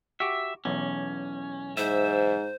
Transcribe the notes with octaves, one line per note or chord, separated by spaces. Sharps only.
F#4 G4 E5
B1 E2 C#4
G#2 C5 E5